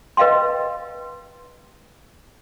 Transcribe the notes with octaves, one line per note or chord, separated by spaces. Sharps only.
B4 D#5 F5 G5 C6